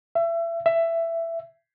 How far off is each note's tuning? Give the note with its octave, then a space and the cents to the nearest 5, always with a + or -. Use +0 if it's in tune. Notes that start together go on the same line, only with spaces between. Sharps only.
E5 +30
E5 +15